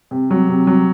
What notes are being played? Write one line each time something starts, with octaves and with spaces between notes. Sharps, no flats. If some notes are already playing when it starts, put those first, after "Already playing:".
C3
F#3
C3
F#3